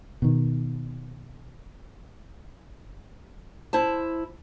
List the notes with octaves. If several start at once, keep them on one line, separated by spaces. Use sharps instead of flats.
B2 D#3
E4 C5 A5